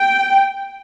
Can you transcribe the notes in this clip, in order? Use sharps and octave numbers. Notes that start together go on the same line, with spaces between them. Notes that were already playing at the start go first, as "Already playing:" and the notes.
Already playing: G5